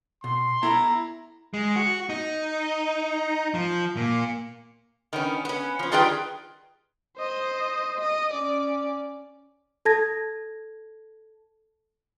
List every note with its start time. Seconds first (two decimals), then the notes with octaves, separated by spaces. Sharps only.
0.24 B2 C6
0.63 B3 E4 A4 A#5 B5
1.54 G#3
1.76 F#4
2.10 D#4
3.54 F3
3.97 A#2
5.13 D#3 B3 C#4
5.45 B3 C#4
5.79 F3 C#4
5.92 D#3 G3 F4 G#4 B4 G5
7.18 C5 D#5
8.00 D#5
8.32 C#4 D5
9.85 A4 A5 G#6 A#6